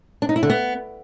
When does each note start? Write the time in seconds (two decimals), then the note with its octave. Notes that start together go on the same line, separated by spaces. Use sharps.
0.22 D4
0.29 D#4
0.36 E4
0.43 D3
0.50 B3